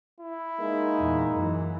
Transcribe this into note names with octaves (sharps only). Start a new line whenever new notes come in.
E4
G#3 A#3 D#4
E2 A#2
F#2 E3